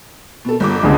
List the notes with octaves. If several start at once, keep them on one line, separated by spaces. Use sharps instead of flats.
B2 A4
G1 D6
C#2 D3 G#3